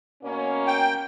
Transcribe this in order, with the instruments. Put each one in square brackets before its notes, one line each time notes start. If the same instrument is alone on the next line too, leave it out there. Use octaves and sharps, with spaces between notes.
[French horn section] B2 A#3 C#4
[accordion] G5